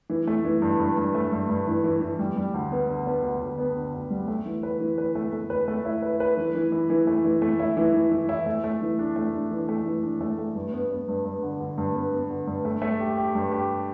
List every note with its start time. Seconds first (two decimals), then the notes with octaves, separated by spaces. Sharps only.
0.10 E3
0.27 A3
0.45 E3
0.62 G2
0.80 G2
0.97 G2
1.15 A3
1.32 G2
1.49 G2
1.67 E3
1.84 E3
2.01 E3
2.19 G3
2.36 G3
2.54 D2
2.71 B3
2.89 D3
3.06 B3
3.23 D2
3.41 D2
3.58 B3
3.76 D3
3.93 D2
4.11 G3
4.28 A3
4.46 E3
4.63 B4
4.80 E3
4.98 B4
5.15 A3
5.33 A3
5.50 B4
5.68 A3
5.85 E4
6.02 B4
6.20 B4
6.37 E3
6.55 E3
6.72 E3
6.90 E3
7.07 A3
7.24 E3
7.42 A3
7.60 E4
7.77 E3
7.94 E3
8.11 E3
8.29 E4
8.46 A3
8.64 A3
8.82 E3
8.99 D4
9.16 A3
9.33 D4
9.51 E3
9.69 A3
9.86 E3
10.03 D4
10.21 A3
10.38 A3
10.55 G2
10.73 B3
10.91 B3
11.08 G2
11.25 G2
11.43 D3
11.60 D3
11.78 G2
11.95 B3
12.13 B3
12.30 D3
12.47 G2
12.65 A3
12.82 A3
13.00 G4
13.17 G4
13.35 G2
13.52 G4